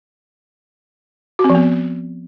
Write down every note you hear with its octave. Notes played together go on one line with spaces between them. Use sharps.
F#4
C4
F3
B3